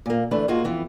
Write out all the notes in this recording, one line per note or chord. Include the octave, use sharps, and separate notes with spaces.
A#2 A#3
D3 E3 A3 D4 B4
G#2 G#3 A#3 D#4 F4 F#4
F2 E3 B3